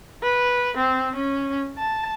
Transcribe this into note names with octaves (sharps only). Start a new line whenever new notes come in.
B4
C4
C#4
A5